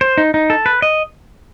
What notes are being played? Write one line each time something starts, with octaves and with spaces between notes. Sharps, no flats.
C5
D#4
D#4
A4
B4
D#5